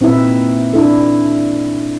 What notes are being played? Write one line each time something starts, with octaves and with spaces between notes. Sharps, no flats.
A#2 C4 D#4 E4 B4 E5
D4 E4 A4